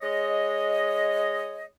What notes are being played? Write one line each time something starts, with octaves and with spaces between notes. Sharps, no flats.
G#3 C#5 D#5